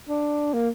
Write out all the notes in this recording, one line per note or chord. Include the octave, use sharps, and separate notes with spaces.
D4
A#3